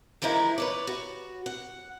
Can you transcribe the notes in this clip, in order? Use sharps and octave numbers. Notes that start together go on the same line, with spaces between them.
E3 F3 G#3 D#4 E4 A#4
B4 C#5 D5
F#4
F#5